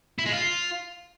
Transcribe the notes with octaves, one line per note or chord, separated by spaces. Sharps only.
E4
G#3
F4